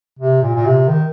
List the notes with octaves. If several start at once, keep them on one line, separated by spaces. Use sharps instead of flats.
C3
A#2
A#2
C3
D#3